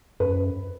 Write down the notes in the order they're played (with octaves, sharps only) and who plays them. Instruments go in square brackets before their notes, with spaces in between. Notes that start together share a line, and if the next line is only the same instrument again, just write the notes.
[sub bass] F#2 [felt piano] B4